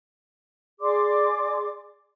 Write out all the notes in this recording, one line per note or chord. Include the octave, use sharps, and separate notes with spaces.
G#4 D5 C6 D6